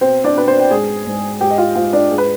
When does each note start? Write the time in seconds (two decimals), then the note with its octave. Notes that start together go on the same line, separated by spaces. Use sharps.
0.01 B2 C4 C5
0.24 D4 D5
0.36 B2 B4
0.48 C4 C5
0.60 G5
0.71 G#2 G#4 G#5
1.06 G#2
1.41 G#2 G4 G5
1.51 D#5
1.58 F4 F5
1.75 G#2 F4 F5
1.93 D4 D5
2.10 G#2 G#4
2.18 B4